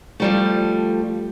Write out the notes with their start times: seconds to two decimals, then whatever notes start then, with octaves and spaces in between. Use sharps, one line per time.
0.20 F3 G3 A3